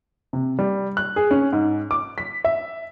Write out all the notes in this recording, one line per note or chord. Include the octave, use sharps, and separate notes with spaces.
C3
G3
F#6
G#4
C#4
G#2
D6
B6
E5